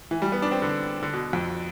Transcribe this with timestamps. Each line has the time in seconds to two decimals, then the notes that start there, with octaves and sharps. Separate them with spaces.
0.11 E3
0.22 G3
0.32 B3
0.42 D4
0.51 C4
0.62 D3
1.03 D3
1.13 B2
1.33 F2